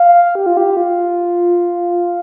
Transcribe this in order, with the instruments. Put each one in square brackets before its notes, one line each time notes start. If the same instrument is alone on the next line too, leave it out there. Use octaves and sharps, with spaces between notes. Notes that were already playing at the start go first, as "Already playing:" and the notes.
Already playing: [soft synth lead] F5
G4
F4
G4
F4